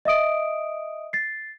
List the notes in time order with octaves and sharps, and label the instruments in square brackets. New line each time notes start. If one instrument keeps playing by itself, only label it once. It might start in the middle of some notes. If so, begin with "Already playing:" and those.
[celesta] D#5 E5 D#6 D7
A6 C7